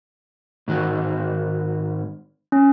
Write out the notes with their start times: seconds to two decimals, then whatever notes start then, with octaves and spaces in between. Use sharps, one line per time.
0.68 G#2 D#3 F#4
2.52 C#4